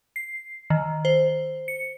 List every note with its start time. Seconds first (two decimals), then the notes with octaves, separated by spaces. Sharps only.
0.16 C7
0.70 D#3
1.05 C5
1.68 C#7